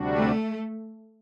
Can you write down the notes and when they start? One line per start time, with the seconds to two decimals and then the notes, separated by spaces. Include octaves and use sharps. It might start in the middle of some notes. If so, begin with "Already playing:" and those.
Already playing: D2 C3 G3 D4 F#4
0.14 A3